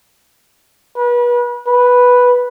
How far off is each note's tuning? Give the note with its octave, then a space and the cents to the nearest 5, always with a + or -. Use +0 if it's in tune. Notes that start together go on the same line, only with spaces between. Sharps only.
B4 -35
B4 -5